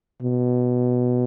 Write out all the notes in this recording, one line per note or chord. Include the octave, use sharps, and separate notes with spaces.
B2